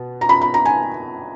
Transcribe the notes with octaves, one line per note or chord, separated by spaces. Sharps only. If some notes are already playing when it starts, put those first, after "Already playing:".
Already playing: B2 B3
A#5
B5
B5
A#5
G#5